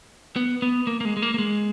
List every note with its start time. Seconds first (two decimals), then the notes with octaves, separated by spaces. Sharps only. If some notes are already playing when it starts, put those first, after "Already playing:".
0.36 B3
0.62 B3
0.87 A#3
1.01 A#3
1.05 G#3
1.17 G#3
1.22 A#3
1.34 A#3
1.38 G#3